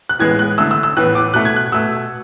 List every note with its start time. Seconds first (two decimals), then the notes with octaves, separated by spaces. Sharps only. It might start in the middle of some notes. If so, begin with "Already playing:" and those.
0.09 F#6
0.19 A2 E3 G#3 B3 G#6
0.39 F#6
0.58 D3 A3 E6
0.71 E6
0.83 E6
0.97 A2 E3 B3 F#6
1.15 D6
1.34 B2 A3 F#6
1.45 G#6
1.56 F#6
1.72 B2 A3 E6